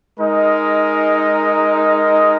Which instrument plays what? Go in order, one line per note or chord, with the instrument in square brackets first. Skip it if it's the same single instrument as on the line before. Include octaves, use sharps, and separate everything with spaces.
[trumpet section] G#3 D#4 A#4 D#5